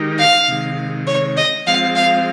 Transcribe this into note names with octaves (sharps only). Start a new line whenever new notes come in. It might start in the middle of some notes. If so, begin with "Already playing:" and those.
Already playing: D#3 G#3 D#4 G4 A#4
F5
C3 D#3 G#3
C#5
D#5
F3 G#3 C4 F5
F5